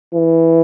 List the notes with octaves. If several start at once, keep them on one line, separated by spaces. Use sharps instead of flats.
E3